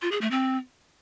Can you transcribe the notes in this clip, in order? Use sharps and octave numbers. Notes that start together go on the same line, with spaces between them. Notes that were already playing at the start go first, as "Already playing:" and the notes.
F4
G#4
A3
C4